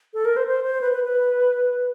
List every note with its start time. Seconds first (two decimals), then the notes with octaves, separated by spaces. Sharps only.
0.14 A4
0.25 A#4
0.37 C5
0.48 C5
0.64 C5
0.81 B4
0.93 B4
1.04 B4